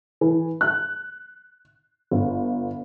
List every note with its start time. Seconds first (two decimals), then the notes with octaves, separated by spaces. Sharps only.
0.21 E3
0.61 F#6
2.11 G1